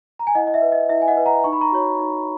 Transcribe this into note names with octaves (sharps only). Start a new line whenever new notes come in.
A#5
G#5
E4 D#5 F#5
D#5
E5
B4
D#5
E4 E5
G#5
D#5 F#5
B4
F#5 A#5
D#4 C#6
B5
A#5 C#6
F#4 C#5
D#4